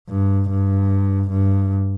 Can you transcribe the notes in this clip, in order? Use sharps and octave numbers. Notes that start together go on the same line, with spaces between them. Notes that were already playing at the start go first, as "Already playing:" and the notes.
G2
G2
G2